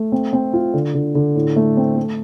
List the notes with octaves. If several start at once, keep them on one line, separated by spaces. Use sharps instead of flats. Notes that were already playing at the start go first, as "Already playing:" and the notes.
Already playing: A3
C4
C4
F4
D3
D3
D3
A2
A3
C4
A3